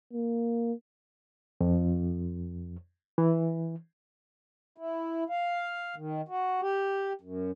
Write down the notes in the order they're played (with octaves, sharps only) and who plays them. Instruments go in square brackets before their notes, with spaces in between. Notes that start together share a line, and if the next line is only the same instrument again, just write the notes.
[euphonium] A#3
[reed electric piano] F2
E3
[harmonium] E4
F5
D#3
F#4
G4
F#2